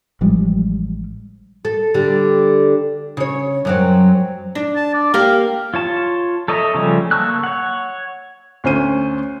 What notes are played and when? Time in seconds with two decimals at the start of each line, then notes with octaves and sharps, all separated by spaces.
0.21 A1 F3 G3 G#3
1.65 A4
1.94 D3 G3
3.17 C#3 C#5
3.65 F#2 F#3 C4
4.55 D4
4.76 A5
4.94 D5
5.14 A#3 G4 A#4 F5
5.74 F4 C#5 A5
6.48 A4 C#5 D#5 E5 A#5
6.74 C#3 F3 G3 A3 C#4
7.11 A#3 A5 C#6 E6 F#6
7.43 C#5 F#5
8.64 D2 C#4 C5 D#7